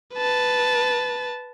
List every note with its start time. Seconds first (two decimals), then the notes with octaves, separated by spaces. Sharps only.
0.14 B4 A5